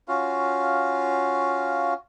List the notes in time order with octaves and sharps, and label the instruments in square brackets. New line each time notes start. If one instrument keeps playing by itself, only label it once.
[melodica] C#4 F4 F#4 F5